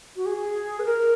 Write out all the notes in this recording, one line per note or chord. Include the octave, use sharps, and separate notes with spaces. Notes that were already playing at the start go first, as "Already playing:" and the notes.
F#4
G#4
B4
A#4